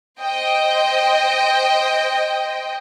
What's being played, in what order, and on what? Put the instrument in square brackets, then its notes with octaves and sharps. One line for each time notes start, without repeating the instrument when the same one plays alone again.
[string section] C5 D#5 G5